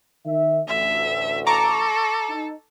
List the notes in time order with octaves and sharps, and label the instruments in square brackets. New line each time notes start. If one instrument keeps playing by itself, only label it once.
[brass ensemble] D#3 E5
[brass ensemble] A1 D2 [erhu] E5
[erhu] A4 [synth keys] A#5 C#6 D6
[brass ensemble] D#4